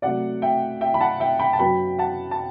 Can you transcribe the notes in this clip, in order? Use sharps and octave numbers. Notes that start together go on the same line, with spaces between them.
C3 F#3 A3 D5 F#5
E5 G5
E5 G5
B5
F#5 A5
E5 G5
G5 B5
A5
F#2 F#3 B3 G5 B5
F#5 A5
A5